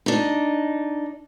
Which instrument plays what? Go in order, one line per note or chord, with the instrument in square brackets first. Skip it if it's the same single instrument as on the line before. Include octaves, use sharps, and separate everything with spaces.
[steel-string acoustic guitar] D4 D#4